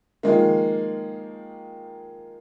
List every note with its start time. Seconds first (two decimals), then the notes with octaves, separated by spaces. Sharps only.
0.23 D#3 F3 G#3 A#3